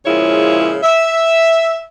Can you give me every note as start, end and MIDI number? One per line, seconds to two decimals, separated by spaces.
0.06 0.78 46
0.06 0.78 49
0.06 0.78 53
0.06 0.78 56
0.06 0.78 64
0.06 0.78 73
0.83 1.86 76